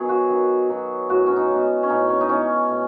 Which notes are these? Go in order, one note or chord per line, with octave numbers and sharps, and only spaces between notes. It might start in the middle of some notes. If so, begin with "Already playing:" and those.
Already playing: D#3 F#3 B3 G#4
F#4
D#3
F#3 B3
A2 F#4
C#4
D#4
E3 G#3 B3
C#4
A2 D#4
C#4
D#4
E3 G#3 B3 C#4
A2